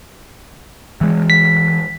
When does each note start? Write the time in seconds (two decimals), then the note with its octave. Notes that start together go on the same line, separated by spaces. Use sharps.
1.01 E3 G#3
1.30 B6